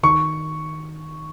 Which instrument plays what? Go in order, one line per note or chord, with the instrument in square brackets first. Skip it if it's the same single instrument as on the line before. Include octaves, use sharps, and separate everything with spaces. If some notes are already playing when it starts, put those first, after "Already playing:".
[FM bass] D#3 [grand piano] C#6